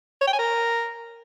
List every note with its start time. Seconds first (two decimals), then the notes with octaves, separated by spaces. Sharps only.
0.21 C#5
0.27 G5
0.33 G#5
0.39 A#4